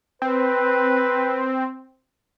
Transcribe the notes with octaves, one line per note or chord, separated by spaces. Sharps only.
C4 B4